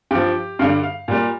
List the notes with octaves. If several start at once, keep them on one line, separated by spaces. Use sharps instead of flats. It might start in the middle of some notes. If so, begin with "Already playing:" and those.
G2 F3 G4
G2 D3 G3 F5
F5
A#2 G3